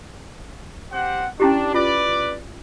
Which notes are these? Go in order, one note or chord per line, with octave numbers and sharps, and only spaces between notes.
C4 G4 F#5
C#4 D4 E4 G4
F4 B4 D5